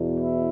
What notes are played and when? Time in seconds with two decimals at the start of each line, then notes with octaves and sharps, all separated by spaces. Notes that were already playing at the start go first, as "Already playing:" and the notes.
Already playing: E2 B2
0.19 E4